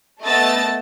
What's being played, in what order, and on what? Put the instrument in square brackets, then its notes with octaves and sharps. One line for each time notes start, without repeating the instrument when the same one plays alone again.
[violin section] A3 B3 D#5 A5 E6 A6